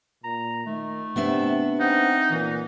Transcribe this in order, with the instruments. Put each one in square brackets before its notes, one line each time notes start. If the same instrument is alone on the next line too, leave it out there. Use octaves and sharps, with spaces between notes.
[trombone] A#2 [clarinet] A#5
[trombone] D#3 [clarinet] A3
[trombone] C3 [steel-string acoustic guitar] B3 D4 E5
[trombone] C4 [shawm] D#4 [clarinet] F#5
[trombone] A#2 [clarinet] E3